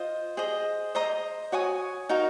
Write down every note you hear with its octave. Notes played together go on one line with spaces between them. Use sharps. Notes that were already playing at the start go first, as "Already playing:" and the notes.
Already playing: F4 C5 D#5
G#4 C5 D#5
C5 D#5 A#5 D#6
F#4 C#5 G#5 D#6
D#4 F#4 A#4 F5